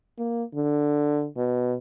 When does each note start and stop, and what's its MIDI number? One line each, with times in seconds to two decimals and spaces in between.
0.19 0.44 58
0.55 1.27 50
1.37 1.76 47